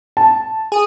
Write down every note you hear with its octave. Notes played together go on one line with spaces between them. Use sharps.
A5
G#4 D#6